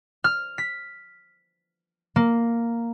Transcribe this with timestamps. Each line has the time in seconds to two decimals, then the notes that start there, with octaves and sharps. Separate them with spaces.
0.24 F6
0.58 B6
2.16 A#3